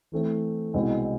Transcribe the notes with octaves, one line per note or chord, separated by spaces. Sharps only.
E3 A3 C4
C2 B2 G#3 C4